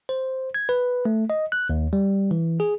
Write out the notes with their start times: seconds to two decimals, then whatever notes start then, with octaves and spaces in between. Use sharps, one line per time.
0.09 C5
0.54 G#6
0.69 B4
1.05 A3
1.30 D#5
1.52 F#6
1.70 D#2
1.93 G3
2.31 E3
2.60 G#4